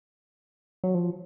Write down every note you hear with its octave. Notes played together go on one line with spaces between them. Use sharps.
F#3
F3